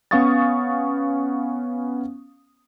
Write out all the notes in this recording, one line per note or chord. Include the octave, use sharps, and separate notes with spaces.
B3 C#4 F5 C#6 D#6 A6